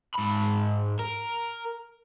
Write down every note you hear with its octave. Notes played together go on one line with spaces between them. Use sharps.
G#2 B5
A#4